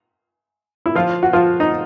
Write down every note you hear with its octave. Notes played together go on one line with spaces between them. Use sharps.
E4
F3 F4
F#4
F3 F4
D#4